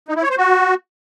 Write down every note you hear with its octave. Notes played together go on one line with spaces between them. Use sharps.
D#4
E4
C#5
C5
F#4